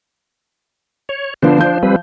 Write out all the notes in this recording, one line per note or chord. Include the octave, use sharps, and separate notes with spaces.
C#5
D3 F3 B3 D4 C5
F3 G6
G3 C4 B4